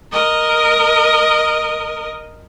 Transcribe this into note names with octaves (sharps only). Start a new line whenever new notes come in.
A#4 D#5